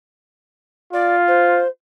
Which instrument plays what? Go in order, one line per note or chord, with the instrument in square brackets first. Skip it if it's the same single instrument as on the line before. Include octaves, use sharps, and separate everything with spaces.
[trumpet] F4 [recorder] D5
[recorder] C5